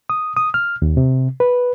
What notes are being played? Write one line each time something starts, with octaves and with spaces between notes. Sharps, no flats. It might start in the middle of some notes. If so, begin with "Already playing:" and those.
D#6
D#6
F6
D#2
C3
B4